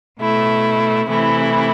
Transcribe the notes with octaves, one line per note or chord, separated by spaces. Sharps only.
B2 A3 E4
C3 E3 A3 E4